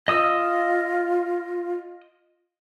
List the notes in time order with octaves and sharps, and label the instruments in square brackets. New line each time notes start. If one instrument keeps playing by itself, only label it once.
[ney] F4 [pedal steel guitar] D#5 D#6 E6